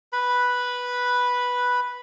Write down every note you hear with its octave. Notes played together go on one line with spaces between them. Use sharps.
B4 B5